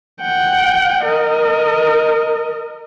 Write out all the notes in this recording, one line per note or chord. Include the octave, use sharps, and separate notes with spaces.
F#5 G5
A#4 D#5